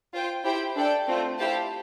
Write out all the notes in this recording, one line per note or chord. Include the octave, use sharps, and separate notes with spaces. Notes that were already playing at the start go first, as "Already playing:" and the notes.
F4 C5 G5
E4 G4 C5 G5
D4 A4 D5 G5
A3 C4 F4 C5
E4 G4 C5 F5 A5